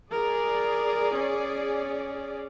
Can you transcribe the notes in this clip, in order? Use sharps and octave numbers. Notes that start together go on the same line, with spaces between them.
G#4 A#4 D5
C#4